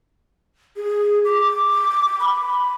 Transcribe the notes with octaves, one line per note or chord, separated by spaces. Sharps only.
G#4
D6
B5